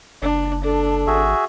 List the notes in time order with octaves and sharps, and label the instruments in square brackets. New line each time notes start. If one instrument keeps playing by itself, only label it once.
[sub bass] F#1 [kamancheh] D4
[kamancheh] D4 [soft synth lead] A4
[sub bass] G#1 [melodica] F#4 G#4 E5